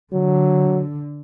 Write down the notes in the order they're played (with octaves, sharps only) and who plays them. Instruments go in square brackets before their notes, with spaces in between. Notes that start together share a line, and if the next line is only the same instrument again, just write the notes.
[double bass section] D3 [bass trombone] F#3